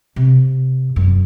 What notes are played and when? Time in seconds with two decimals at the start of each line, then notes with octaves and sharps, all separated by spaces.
0.16 C3
0.96 F#2